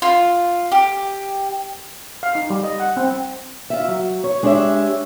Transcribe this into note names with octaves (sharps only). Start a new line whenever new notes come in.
F4
G4
F5
D#4
G3
D#5
F#5
C4
F4 E5
F#3
C#5
G#3 D4 G4 C#5 E5